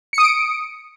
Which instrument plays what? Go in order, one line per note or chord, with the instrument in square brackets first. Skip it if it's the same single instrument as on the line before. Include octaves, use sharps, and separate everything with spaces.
[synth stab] C#7
D#6
D7